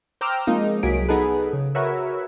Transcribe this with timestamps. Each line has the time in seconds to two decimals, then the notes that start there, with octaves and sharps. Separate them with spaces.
0.21 C5 G5 A#5 D6 E6 F6
0.47 F3 G#3 A#3 C4 D#4
0.83 C2 F#3 A#3 G#4 B6 D7
1.08 B3 D#4 G#4 A4 B4
1.53 C#3
1.75 F#4 A#4 B4 C#5 E5